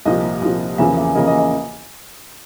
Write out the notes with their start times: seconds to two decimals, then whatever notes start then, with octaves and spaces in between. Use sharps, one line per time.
0.05 C2 A#2 F3 D#5
0.41 C2 A#2 F3
0.78 E2 C#3 F3 A#3 E5
0.97 E5
1.15 E2 C#3 F3 A#3 D#5
1.27 D#5
1.39 D#5